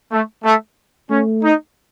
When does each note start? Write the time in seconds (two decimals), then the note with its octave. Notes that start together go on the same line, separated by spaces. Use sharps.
0.11 A3
0.44 A3
1.10 A3 C#4
1.43 D#4